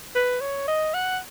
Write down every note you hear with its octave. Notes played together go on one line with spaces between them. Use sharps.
B4
C#5
D#5
F#5